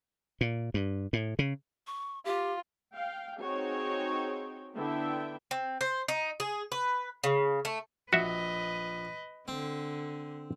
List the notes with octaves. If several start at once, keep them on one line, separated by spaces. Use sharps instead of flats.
A#2
G2
A2
C#3
C#6
F4 G4
F5 G5
C4 D#4 F#4 G#4 C#5 G5
D3 B3 E4 E5 G5
C4
C5
D#4
G#4
B4
C#3
A3
A#1 F#4 B4 D#5 E5
D3 C4